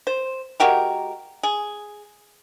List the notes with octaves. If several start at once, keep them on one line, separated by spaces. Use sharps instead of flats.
C5
G#3 F#4 G4 A#4
G#4